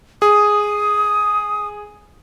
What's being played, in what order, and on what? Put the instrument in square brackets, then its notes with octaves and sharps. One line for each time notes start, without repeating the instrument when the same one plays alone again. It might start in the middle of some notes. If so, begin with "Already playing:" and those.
[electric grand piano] G#4 [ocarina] D#6